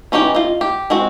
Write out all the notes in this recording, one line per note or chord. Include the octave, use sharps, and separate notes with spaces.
E3 C#4 D#4 G4 G5
F4 D#5
G4
G#3 C4 F#4